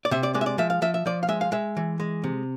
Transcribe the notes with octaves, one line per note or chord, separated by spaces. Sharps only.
D5
C3 E5
D5
G#3 D5
E5
D5
F3 E5
F5
F3 E5
E5
F3 D5
F5
G#3 E5
F5
G#3 E5
E3
G#3
C3